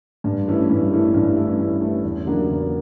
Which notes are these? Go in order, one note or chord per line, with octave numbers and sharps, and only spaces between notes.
G2
E3 A3 C#4 E4
G2
E3 A3 C#4 E4
G2
E3 A3 C#4 E4
G2
E3 A3 C#4 E4
E2
C#3 F#3 A#3 D4
E2